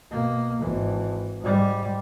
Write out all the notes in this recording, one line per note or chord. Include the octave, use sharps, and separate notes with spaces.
B2 A#3
G#1 E3
G#2 G3